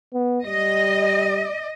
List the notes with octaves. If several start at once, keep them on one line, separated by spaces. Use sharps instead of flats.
B3
G3 D#5